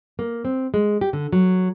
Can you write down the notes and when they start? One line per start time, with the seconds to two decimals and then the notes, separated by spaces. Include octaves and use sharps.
0.19 A#3
0.45 C4
0.74 G#3
1.01 G4
1.13 D3
1.32 F#3